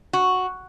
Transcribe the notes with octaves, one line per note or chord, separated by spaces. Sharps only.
F#4